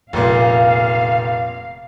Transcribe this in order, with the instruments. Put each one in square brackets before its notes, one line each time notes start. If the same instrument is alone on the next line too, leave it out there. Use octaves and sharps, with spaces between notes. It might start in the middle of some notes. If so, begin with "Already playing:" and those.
[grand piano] F1 A#2 [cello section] F5